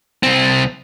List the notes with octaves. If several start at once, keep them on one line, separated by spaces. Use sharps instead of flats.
C2 C4